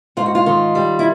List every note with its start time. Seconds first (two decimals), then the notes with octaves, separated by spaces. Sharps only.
0.17 G#2 F4
0.26 F#4
0.35 F4
0.46 D#3
0.75 G3
0.99 E4